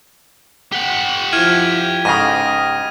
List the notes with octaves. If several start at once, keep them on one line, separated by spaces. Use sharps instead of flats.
G4 F#5
F3 E4 F6 G#6 D#7
G#2 C#3 A4 C5 G#5 D#6 A#6 D#7